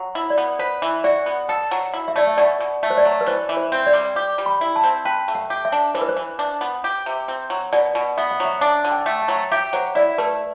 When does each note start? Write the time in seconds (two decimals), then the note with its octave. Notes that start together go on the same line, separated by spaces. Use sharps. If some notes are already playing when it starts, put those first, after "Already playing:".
Already playing: F#3
0.15 E4
0.30 D5
0.38 B3
0.59 B4 C5
0.82 E3
1.04 F#4 D5
1.26 B3
1.49 A4 F#5
1.71 F#3
1.94 E4
2.08 E5
2.16 A3 D5
2.27 E5
2.38 B2 D5
2.60 B2
2.83 A3
2.90 C5
2.98 D5
3.05 F#3
3.21 B4
3.26 E3 C5
3.49 E3
3.57 C5
3.72 C4
3.87 D5
3.93 G3
4.16 G4
4.38 G3
4.46 B5
4.61 E4
4.76 A5
4.84 C4
5.05 B4 G5
5.28 A3
5.35 F#5
5.50 G4
5.65 E5
5.72 D4
5.95 E3 C5
6.01 B4
6.09 C5
6.17 E3
6.39 D4
6.61 B3
6.84 G4
7.06 C3
7.28 C4
7.50 F#3
7.73 B2 D5
7.95 B2
8.17 B3 E5
8.31 F#5
8.40 F#3 E5
8.61 D4 F#5
8.85 D3
8.91 G5
9.06 A3
9.22 F#5
9.28 F#3
9.52 G4 E5
9.73 F#3 C5
9.95 E4 D5
10.18 A3 B4